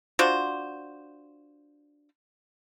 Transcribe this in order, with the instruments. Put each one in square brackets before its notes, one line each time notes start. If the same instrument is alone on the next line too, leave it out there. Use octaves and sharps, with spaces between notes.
[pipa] D4 F4 F#4 C5